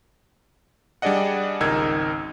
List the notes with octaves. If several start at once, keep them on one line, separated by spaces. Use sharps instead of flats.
G3 D4 G#4 D5 D#5 F#5
G#1 C#2 D#4 A#4 E6 G#6